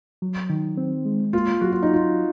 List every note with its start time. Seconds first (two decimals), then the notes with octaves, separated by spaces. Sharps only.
0.22 F#3
0.50 D#3
0.77 C4
1.05 G#3
1.33 A#3 F4
1.61 F#3 F#4
1.72 F4
1.83 D#4
1.90 F4 F#4